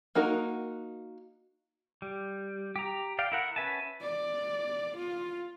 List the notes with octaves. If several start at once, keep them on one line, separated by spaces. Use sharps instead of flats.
A#3 D#4 F#4 A#4
G3
G4 A#5
D5 F5 G5
E4 A#4 F#5
C#4 B4 E5 G#5 A5
D5
F4